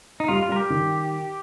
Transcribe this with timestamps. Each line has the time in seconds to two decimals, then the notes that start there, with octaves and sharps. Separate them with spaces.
0.20 D#4
0.28 G3 F4
0.42 F4
0.49 G3 A#4
0.56 G4
0.70 D#3